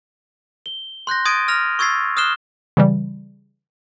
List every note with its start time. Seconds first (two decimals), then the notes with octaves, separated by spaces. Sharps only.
0.66 G7
1.07 C6 F#6 G6 A#6
1.25 C6 D#6 G#6 A6 D7 D#7
1.48 F6 A#6 F7
1.79 C#6 E6 G#6 A6 C7
2.17 D#6 F6 F#6 C7 E7 G7
2.77 C#3 E3 G3